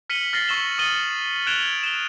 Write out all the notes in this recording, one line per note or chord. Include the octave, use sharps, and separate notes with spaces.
F6 B6 C#7 D#7 F#7 G7
F6 A6 A#6 C7 G7
C#6 E6 E7 F#7 G7
D#6 A6 C#7 D#7 F#7 G7
F#6 G#6 D7 E7 F7 G7
E7 F7 G7